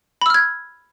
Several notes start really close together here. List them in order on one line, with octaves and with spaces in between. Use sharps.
B5 E6 F6 G#6